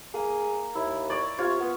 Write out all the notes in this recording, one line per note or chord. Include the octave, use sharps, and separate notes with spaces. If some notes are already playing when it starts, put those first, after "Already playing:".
A#3 G#4
D#2 E4
C#5 D5
C3 F4 C#5
B3